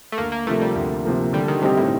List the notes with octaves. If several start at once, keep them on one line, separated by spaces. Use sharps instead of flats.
A3
D2 A#3
A#3
C3 F3 A3 A#3
G3
D2
C3 F3 A#3
D3 G3
D#3
C3 G3 C4 D#4 G4
A2